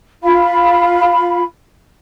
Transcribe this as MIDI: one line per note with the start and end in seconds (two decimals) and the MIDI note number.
0.23 1.43 65
0.23 1.43 77
0.23 1.43 83